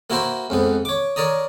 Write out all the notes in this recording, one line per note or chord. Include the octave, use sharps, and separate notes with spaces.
A#3 E4 F#4 A#4 C5
F2 G#2 B3
C#5 D6
A#4 C#5 D5 A#5 D#6